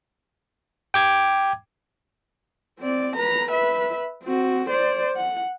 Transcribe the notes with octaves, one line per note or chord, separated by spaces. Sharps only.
G5 D6 G#6
C4 D5
B4 A#5
B4 E5
C4 F#4
C5 D5
F#5